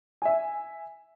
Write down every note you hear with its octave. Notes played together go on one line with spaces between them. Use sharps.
E5 G#5